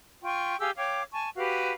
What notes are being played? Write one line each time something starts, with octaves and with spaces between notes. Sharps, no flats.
F4 G5 C#6
G4 G#4 F5 E6
C#5 F5 G5 D6
G#5 A5 C#6
F#4 G4 B4 F5